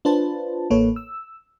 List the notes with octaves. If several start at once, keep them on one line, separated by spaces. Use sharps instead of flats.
D4 F4 B4 C5 A5
A1 A#3 A4 B4 C#5
E6